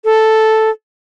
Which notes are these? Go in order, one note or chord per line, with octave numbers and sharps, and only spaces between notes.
A4